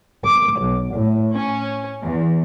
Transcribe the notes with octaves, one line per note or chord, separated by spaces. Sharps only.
D6
B1
A2
C#4
E2